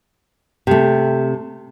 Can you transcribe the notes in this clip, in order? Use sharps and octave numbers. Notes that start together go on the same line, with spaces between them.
C3 A3